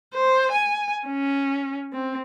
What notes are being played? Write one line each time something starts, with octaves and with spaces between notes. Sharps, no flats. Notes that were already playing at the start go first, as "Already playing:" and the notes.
C5
G#5
C#4
C4